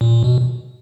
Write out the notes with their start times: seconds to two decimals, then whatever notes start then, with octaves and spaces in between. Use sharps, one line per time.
0.01 A#2
0.24 B2